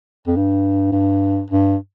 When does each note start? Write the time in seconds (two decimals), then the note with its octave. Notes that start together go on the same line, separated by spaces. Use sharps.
0.27 F2
0.36 G2
0.92 G2
1.50 G2